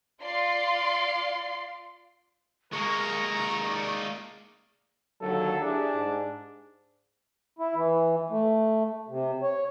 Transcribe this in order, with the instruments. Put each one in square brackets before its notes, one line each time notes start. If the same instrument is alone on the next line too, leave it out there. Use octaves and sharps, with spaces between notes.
[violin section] F4 D5 F5 C6 C7
[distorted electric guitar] G#3 A#3 [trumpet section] A#4 A#5 [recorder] C#6
[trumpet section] D#4 D5
[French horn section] D#2 D3 F#3 [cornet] A4
[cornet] D4 [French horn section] E4 G4 G#4
[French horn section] G#2
[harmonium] E4
E3
A3
C3
C#5